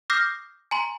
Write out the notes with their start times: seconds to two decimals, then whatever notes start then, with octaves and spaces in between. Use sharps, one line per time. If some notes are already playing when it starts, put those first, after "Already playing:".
0.10 D6 D#6 F6 G6 A#6 C7
0.71 G#5 A#5 C6